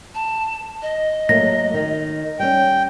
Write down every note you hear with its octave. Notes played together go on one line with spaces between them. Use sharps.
A5
D#5
F#3 A3 A#3 A#6
D#3
G3 C#4 G5